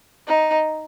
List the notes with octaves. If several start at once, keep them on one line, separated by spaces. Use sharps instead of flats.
D#4